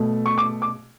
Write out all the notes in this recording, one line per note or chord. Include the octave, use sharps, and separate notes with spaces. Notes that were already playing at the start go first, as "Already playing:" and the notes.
Already playing: B2 A3
C#6
D6
D6